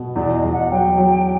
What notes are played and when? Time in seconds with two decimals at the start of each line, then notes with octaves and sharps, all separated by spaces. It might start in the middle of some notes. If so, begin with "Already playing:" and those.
Already playing: B2
0.16 E2 D5
0.34 D#5
0.44 E2
0.52 F#5
0.71 F#3 G5
0.97 F#3